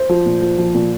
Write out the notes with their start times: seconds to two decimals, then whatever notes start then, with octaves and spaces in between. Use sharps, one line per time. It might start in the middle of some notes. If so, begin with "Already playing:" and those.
Already playing: C5
0.09 F3
0.26 A#2
0.42 F3
0.58 F3
0.75 A#2